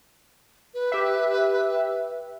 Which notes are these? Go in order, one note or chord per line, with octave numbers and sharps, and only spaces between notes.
B4
G4 E5